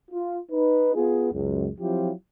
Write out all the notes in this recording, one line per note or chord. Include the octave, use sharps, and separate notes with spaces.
F4
D#4 B4
B3 F4 G#4
C#2 F#2 G#3
F3 F#3 C4 E4 F4 G4